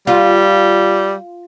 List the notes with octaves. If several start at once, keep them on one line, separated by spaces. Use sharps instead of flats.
G3 F4